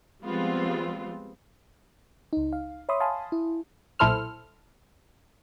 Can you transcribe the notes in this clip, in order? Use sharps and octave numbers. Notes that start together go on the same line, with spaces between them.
F3 G3 G#3 B3 C4 F4
C#2 D#4
F5
C#5 E5 B5 C6 D#6
F5 G#5 A5 B5 C6 D#6
E4
B1 A#2 E4 A4 C5 F6